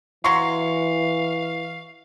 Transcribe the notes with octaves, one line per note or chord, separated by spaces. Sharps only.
E3 F#3 F5 C6 C#6